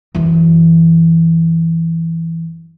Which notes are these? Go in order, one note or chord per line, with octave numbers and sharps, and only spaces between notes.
F#2 E3